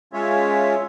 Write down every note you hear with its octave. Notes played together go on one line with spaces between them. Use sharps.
G#3 C#4 F4 C#5 E5